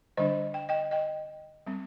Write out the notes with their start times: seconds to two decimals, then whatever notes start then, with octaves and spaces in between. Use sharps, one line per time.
0.17 D3 G3 D4 C5 D#5
0.54 G5
0.69 D#5 G5
0.91 D#5 G5
1.66 G3 C4